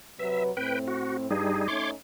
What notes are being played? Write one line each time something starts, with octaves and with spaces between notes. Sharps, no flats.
C3 F#3 B4 E5
A2 C4 B4 G5
F#4
G2 G3 D#4 G#4
A3 C#4 D#4 C#5 C6 D6